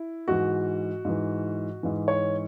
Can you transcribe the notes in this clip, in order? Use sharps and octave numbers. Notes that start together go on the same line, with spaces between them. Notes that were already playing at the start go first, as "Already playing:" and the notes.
Already playing: E4
G#2 E3 F#4
G#2 E3
G#2 E3
C#5